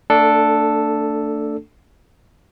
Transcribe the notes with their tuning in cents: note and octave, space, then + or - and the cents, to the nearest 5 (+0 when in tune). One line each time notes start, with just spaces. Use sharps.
A3 +30 D4 +0 A4 +0